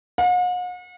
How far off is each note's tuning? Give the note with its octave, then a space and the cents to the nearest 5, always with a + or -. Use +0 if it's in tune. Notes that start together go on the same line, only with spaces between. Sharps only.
F#5 -45